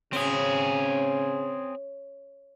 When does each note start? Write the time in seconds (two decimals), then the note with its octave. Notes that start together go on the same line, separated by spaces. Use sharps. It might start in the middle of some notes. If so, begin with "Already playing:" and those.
0.13 C#3 C4 C#4 G#4